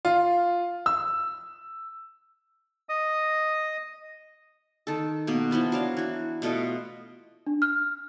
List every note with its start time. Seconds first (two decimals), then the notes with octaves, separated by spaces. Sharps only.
0.05 F4
0.86 E6
2.89 D#5 D#6
4.87 D#3 A4
5.27 B2 A#3 B3
5.51 E3 F3 B3 F4
5.72 F#3 D4 F5
5.97 E3 F#4
6.42 B2 A3 F4 D#5
7.47 D4
7.62 F6